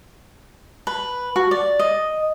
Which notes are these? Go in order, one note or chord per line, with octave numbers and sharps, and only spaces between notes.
B4
F#4
D5
D#5